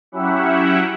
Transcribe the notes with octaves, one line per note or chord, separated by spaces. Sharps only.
F#3 C#4 E4 G4 E5 F#5